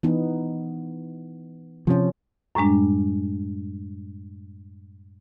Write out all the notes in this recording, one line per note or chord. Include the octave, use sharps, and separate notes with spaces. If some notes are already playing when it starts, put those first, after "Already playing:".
E3 B3 D#4
C3 F3 C#4
F#2 A2 G3 G#3 D4